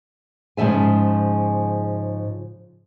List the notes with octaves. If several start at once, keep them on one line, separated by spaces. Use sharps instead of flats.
G#2 C#3 F3 E5 G#5